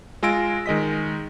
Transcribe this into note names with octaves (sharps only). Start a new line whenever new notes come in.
G#3 F4 G#5 E6 A#6 D7
D#3 G#3 D#5 B6